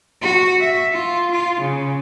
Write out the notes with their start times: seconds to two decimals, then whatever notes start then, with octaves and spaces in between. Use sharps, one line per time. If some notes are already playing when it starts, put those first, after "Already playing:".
0.22 F#4
0.60 E5
0.91 F4
1.31 F4
1.61 C#3